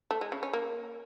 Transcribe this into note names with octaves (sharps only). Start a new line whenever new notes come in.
A3
G#3
C#3
C#4
A#3